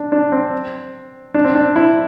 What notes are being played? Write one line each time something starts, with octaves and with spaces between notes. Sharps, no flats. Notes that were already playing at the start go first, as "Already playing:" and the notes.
Already playing: D4
D4
C4
D4
C4
D4
E4